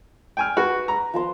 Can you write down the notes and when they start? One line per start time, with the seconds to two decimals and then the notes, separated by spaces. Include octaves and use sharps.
0.37 G5 G#5 F6
0.57 F#4 B4
0.88 A#5
1.14 F3 A5 C6